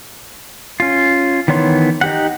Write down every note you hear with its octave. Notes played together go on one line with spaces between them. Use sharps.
C#4 F4
D#3 E3 B3 C#5 C6
D#4 G4 F#5